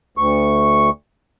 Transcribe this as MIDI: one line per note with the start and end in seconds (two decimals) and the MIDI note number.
0.18 0.90 38
0.18 0.90 85